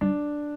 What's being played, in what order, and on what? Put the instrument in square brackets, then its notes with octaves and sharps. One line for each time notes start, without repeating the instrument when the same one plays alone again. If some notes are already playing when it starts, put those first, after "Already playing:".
[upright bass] G3 [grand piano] D4